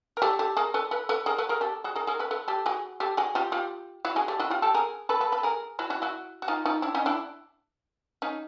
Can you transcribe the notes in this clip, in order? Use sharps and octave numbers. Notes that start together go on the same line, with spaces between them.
A#4
G4 A4
G4 A4
G#4 A#4
A4 B4
A4 B4
A4 B4
G#4 A#4
A4 B4
G#4 A#4
G4 A4
F#4 G#4
G#4 A#4
G#4 A#4
A4 B4
A4 B4
G4 A4
F#4 G#4
G4 A4
F#4 G#4
F4 G4
F4 G4
E4 F#4
F#4 G#4
G4 A4
E4 F#4
F4 G4
G4 A4
G#4 A#4
A4 B4
A4 B4
A4 B4
G#4 A#4
E4 F#4
E4 F#4
E4 F#4
F#4
D#4 F4
D#4 F4
D4 E4
C#4 D#4
D4 E4
C#4 D#4